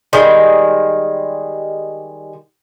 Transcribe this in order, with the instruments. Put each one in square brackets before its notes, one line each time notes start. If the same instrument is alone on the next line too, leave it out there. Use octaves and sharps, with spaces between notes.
[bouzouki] D#3 G3 G#3